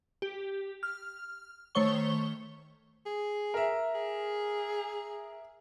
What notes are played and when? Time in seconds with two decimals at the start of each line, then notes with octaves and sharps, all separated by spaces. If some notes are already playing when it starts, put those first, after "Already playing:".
0.22 G4
0.83 F6
1.75 D#3 A3 C5 C#5 C#6 G7
3.06 G#4
3.54 A#4 E5
3.94 G#4